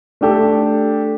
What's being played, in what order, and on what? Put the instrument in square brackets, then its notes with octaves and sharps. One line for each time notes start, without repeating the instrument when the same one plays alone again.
[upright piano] A3 D4 G4 A4